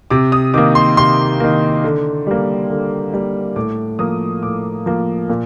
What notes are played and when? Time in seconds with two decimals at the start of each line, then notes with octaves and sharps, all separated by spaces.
0.10 C3 D6
0.32 D#6
0.54 D#3 A#3 D6
0.75 C6
0.97 C3 C6
1.40 D#3 A#3
1.84 D3
2.27 G3 A#3
2.70 D3
3.13 G3 A#3
3.56 A2 D6
3.99 F3 A#3 D#6
4.43 A2 D6
4.86 F3 A#3
5.30 A#2